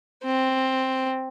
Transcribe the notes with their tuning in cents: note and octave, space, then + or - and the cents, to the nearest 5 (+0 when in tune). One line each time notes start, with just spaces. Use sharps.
C4 +5